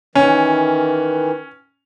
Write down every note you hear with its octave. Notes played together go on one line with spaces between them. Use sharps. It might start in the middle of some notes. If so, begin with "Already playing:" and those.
D#3 E3 C#4